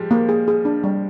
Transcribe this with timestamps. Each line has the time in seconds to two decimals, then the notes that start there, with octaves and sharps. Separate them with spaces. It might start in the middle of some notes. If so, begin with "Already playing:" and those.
Already playing: F3 G3 G#3
0.11 A#3
0.29 G#4
0.48 G#4
0.65 D4
0.84 G3